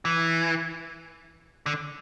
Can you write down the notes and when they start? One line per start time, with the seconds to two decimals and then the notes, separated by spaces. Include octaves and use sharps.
0.05 E3
1.66 D3